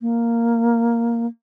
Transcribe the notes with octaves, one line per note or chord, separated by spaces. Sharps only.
A#3